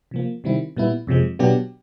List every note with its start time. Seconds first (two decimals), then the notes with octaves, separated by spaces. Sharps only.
0.11 C3 F3 A#3
0.44 C3 D#3 G3 C4 E4
0.77 A#2 G3 B3 E4
1.07 F2 C3 F3 G#3
1.39 B2 F#3 B3 D4 G4